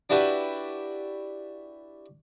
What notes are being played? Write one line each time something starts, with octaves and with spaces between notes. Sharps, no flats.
D4 E4 F#4 G4 B4